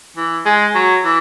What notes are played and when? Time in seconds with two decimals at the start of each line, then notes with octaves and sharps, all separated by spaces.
0.17 E3
0.46 G#3
0.75 F#3
1.05 E3